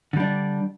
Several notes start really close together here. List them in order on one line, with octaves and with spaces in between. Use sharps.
D3 G3 D4